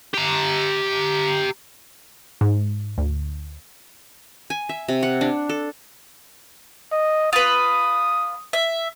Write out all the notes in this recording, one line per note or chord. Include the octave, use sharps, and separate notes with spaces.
G4 A#5
G#2
D2
G#5
E5
C3
F#5
D4
A4
D#5
F4 B4 D#6
E5